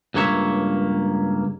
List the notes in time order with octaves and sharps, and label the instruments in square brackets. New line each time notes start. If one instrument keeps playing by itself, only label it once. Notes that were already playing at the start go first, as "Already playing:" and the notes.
[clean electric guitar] C#2 G2 A#3 C#5 E5